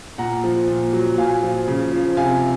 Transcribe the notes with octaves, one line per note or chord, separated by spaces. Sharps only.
A#2 F#5 A#5
F3
A#2
F#3
A#2 F5 G#5
F3
C#3
F3
C3 F5 G#5